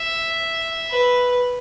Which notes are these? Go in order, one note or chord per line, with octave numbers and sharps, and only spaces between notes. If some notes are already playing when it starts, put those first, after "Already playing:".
Already playing: E5
B4